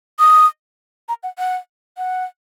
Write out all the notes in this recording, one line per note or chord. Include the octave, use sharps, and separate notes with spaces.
D#6
A#5
F#5
F#5
F#5